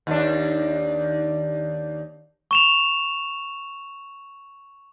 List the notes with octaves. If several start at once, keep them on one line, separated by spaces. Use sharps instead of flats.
D#2 D4
C#6 E7 F7